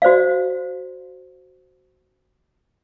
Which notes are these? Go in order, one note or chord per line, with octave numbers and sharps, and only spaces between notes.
F#4 C5 D5 F5